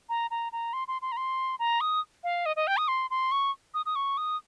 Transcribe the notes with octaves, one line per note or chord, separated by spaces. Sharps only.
A#5
A#5
A#5
C6
C6
C6
A#5
C6
A#5
D#6
F5
D#5
D#5
G5
D#6
C6
C6
C#6
D#6
D#6
C#6
D#6